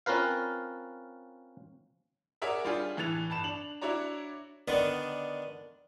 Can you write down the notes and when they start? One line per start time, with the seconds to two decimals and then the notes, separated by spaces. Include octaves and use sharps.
0.06 C4 C#4 F4 A#4 B4 F5
2.42 G#4 A#4 C#5 D5 E5 F#5
2.64 G3 D4 F4 G4 G#4
2.97 A2 E3 F#6 A6 F7
3.30 G1 A5 B5 E7
3.44 D4 F7 F#7
3.82 D4 E4 F#4 C#5 D5 A#5
4.68 D3 D#3 B3 D4